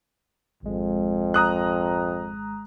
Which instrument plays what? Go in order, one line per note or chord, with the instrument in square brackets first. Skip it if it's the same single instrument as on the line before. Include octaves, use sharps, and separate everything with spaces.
[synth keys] G#1 G#3 [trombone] F2
[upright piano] A#5 D#6 F#6